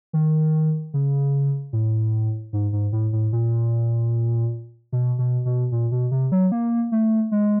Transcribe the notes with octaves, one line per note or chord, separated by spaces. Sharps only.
D#3
C#3
A2
G#2
G#2
A2
A2
A#2
B2
B2
B2
A#2
B2
C3
F#3
A#3
A3
G#3